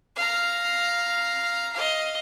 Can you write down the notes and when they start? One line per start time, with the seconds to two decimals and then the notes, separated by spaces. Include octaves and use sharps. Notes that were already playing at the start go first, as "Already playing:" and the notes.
0.16 F5 A#5
1.73 D#5 F5